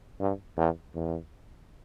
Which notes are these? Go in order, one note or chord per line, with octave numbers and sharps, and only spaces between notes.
G2
E2
E2